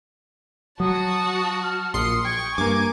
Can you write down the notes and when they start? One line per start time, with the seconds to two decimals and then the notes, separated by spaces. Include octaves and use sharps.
0.80 F#3 F#4 A5 D#6
1.63 F6
1.94 A#1 C6 D#6 C#7
2.25 G5 C#6 G#6
2.58 G2 A#3 G#5 D6